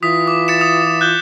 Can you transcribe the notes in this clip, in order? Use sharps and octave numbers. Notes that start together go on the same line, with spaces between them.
E3 F4 D#6 B6
D6
A6 C#7 E7
D#6
F#6 G6 G7